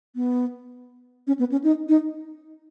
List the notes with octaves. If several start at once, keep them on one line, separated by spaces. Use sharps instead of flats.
B3
C#4
B3
C#4
D#4
D#4